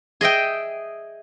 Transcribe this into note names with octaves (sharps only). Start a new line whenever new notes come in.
G#4 D#5 E5 G5